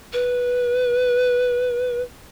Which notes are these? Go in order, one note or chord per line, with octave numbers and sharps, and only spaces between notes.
B4